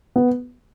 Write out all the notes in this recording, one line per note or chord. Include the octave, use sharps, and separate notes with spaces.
B3